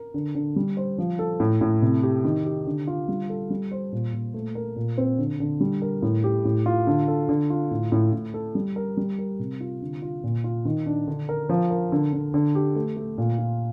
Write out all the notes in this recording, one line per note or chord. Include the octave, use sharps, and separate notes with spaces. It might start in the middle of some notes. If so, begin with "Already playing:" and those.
Already playing: A#4
D3
D3
G3
C5
F3
A4
A2
A2
C3
G4
D#3
G4
D3
F4
G3
A4
G3
C5
A#2
A#2
A3
A#4
A#2
C4
D3
D3
G3
A#4
A2
G4
A2
F4
D3
A4
D3
F4
A2
A2
A2
A4
G3
A#4
G3
A#4
C3
F4
D3
F4
A#2
F4
D#3
D4
D3
A#4
F3
A#4
D3
D3
D3
G4
A3
A3
A#2
F4